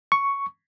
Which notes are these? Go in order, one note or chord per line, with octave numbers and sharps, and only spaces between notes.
C#6